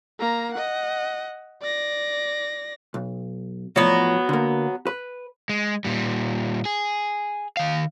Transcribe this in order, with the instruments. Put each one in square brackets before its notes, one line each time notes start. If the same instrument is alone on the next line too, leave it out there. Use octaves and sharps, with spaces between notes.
[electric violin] A#3 A#5
D#5 F#5
D5 A#6
[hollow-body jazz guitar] B1
[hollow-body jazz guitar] E2 A2 F3 [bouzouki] F#3 B3
[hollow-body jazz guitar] D3 A#3
B4
[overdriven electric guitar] G#3
A#2 G3
G#4
D#3 F5